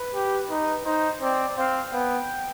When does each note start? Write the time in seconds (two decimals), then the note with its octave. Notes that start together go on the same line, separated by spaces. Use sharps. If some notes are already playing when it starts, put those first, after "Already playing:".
Already playing: B4
0.14 G4
0.50 D#4 B4
0.86 D#4 C5
1.21 C4 D5
1.57 C4 F5
1.92 B3 G5